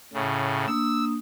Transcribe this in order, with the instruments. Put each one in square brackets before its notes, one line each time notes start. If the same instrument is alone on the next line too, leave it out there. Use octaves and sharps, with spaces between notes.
[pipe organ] A2 C#3
[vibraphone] A#3 D4 D#6 [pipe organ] E6